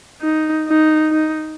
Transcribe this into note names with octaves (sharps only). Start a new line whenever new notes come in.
D#4
D#4
D#4